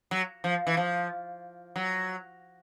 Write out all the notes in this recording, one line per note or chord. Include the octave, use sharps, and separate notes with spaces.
F#3
F3
E3
F3
F#3